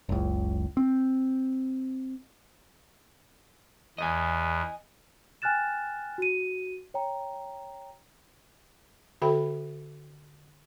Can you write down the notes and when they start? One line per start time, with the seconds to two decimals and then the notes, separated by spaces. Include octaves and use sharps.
0.09 F#1 C#2
0.77 C4
3.98 E2 D#5 G#5
5.42 G5 G#5 F6 F#6 A6 E7
6.18 F#4 D#7
6.94 C#5 G5 A#5
9.22 D3 F#4 A4 E5 G5 B5